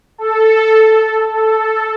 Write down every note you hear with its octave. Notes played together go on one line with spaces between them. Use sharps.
A4
A4